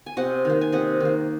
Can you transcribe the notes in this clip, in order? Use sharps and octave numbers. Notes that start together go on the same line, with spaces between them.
G#5
C3 D#5 F#5
D#3 A#3
G#5
C3 D#5 F#5
D#3 A#3